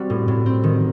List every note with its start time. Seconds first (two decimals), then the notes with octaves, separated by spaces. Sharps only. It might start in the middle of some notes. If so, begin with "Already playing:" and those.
Already playing: G3 C4 F#4
0.10 A2
0.28 A2
0.46 C4
0.64 D#3